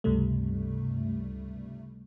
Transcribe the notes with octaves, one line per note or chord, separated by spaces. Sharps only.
C#2 G2 C3 G3 A3